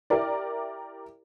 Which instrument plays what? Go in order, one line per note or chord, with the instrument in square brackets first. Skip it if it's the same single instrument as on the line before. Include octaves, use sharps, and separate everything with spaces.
[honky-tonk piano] E4 G4 A#4 D5